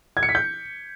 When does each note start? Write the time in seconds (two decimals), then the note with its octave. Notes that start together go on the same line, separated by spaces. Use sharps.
0.17 G#6
0.23 C#7
0.29 B6
0.35 G6